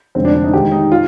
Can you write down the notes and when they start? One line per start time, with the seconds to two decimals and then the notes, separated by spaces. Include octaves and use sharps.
0.15 F1 F2 D3 G#3 C4
0.25 D4
0.35 D4
0.44 D#4
0.54 D#2 D#3 G#3 G4
0.72 D#4
0.92 F4